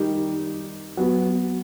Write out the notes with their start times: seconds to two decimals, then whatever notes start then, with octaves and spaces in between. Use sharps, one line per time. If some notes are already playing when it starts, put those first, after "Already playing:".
Already playing: D#3 G3 D#4 G4
0.97 F#3 B3 F#4